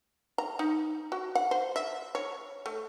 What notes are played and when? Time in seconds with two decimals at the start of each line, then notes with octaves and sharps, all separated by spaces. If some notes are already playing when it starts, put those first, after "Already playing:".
0.38 A#5
0.59 D#4
1.12 F#4
1.35 F#5
1.51 C5
1.76 E5
2.15 C#5
2.66 A3